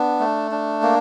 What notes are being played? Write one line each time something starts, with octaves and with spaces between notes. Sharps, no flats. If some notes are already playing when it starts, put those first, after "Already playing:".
Already playing: B3 D4
A3
D4
A#3